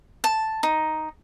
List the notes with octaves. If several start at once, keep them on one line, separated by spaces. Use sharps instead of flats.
A5
D#4